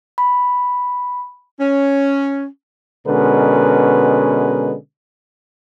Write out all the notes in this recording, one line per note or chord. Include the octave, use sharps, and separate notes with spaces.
B5
C#4
B2 D3 G#3 C#4 A#4 B4